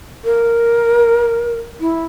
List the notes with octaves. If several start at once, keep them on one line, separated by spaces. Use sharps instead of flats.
A#4
E4